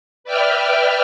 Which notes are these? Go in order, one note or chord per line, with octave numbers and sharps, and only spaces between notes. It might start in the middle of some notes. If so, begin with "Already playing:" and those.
B4 D5 E5 G5 F6